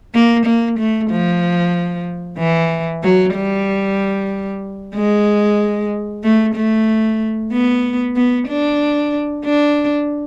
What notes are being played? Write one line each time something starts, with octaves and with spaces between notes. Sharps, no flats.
A#3
A#3
A3
F3
E3
F#3
G3
G#3
A3
A3
B3
B3
D4
D4